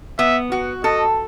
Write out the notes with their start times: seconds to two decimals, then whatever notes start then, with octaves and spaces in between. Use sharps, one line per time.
0.19 B3 E5
0.52 F#4
0.84 A4 D#5